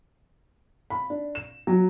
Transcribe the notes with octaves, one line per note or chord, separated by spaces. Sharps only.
B5
D4
E7
F#3